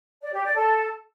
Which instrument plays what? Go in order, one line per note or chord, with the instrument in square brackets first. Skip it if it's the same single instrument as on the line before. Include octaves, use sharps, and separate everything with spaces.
[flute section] D5
G4
D5
A4